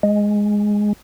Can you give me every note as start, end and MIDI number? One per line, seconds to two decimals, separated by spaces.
0.03 0.93 56